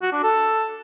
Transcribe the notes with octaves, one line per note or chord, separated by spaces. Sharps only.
F#4
D4
A4